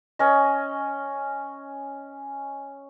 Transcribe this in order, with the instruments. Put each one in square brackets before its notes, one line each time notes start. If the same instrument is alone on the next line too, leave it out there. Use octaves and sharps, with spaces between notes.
[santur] C#4 D#5